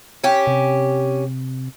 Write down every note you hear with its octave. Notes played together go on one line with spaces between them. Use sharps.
C#4 G4
C3